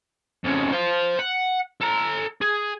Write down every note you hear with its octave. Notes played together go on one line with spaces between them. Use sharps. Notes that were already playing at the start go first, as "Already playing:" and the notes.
F2 C#3
C5 F5
F#5
A4 A#5
G#4